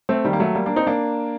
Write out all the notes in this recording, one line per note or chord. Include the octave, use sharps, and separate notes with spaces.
A3 C4
D#3 G3
A#3
F#3 A3
G3 A#3
A#3 D4
C4 D#4
A#3 D4